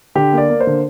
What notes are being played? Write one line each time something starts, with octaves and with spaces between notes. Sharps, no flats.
D3 G4
A#3
D5
A#3
C5
D3